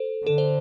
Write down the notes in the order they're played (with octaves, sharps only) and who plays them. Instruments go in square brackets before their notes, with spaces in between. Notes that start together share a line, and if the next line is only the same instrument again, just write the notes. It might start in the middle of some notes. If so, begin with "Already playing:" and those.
Already playing: [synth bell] A4 C5
[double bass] D3 [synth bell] A4
[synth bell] C5